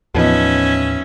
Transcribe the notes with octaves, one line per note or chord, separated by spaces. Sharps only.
D#2 A2 E3 F3 B3 C#4 D#4 E5